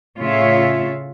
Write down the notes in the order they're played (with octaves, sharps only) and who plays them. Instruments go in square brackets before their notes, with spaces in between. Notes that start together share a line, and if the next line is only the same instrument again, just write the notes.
[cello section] A2 C#3 F4 C#5 E5